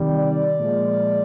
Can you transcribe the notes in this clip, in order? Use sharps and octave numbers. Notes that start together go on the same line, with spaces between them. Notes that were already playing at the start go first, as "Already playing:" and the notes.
Already playing: C3 D#3 G3
D5
A#2 F3 G#3